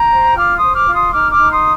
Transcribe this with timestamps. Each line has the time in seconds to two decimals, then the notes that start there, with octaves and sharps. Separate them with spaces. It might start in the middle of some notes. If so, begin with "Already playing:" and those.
Already playing: G5 A#5
0.11 C5
0.35 F4 D6 F6
0.55 C6 D#6
0.61 C5
0.73 D6 F6
0.86 F4
0.93 C6 D#6
1.11 D#4 D6 F6
1.30 D6 F6
1.37 D#4
1.50 C6 D#6